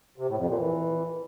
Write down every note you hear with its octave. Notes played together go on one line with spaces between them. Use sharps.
C3
A2
F2
A#2
E3